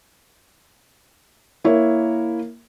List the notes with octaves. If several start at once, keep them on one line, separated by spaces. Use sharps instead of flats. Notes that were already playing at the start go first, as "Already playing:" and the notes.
A#3 E4 A#4 C#5